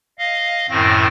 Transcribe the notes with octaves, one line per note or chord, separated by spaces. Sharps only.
D#5 F5
F#2 A2 D#3 C4 A#6